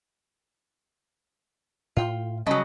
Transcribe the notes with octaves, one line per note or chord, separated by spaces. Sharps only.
A2 F4 G5
C#3 F#3 G3 C#4 D#5 A5 B5